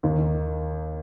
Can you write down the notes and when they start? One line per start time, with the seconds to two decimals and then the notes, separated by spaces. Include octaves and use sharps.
0.03 D#2 D#3